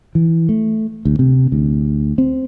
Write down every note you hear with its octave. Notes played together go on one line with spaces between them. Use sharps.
E3
A3
D2
C3
D2
C4